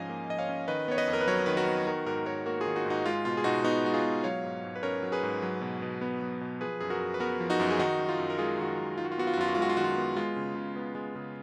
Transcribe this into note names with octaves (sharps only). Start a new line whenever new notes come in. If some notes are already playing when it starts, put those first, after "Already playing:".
Already playing: G#2 F3 C#4 D#5 F5 G#5
A#3
F3 D#5
C#5 F5
C#4
D#3 B4 D#5
B3 C#5
B4 D#5
F2
A#4
B4
F#3 A#4 C#5
D#3 B4
F#4 A#4
B3
D#3 F#4 A#4
G#2 F#4 A#4
G#2 A#4 C#5
A#3 F#4 A#4
F4 G#4
D#3
D#4 F#4
G#2
D#4 F#4
G#3 F4
B2 F4
G#4
B2 D#4 F#4
B3 D#4 F#4
G#3 F#4
F4 G#4
B2
F#3 C#5 F5
G#2
G#2
B4
C#4 A#4 C#5
F#3
G#4 B4
G#2
F#3
B2
B2
B3
F#3
B2
F3 G#4 B4
F#2 G#4
F#4 A#4
F#2
B4
B3 F#4 A#4
F3
D#4 F#4
F#2
G#4
D#3 D#4 F#4
F#2
F4
F#2
A#4
G#3 F4 G#4
D#3 F#4
F4
F#2
D#3 F4
F#4
F4
B3 F#4
F4
F#4
F#2 F4
F#4
G#3 F4
F#4
F4
D#3 F#4
F4
B3
G#3 F4
C#3
C#3
B3
G#3
C#3